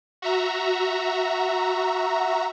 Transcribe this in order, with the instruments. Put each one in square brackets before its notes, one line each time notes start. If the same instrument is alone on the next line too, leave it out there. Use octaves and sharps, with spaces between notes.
[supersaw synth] F#4 E5 A#5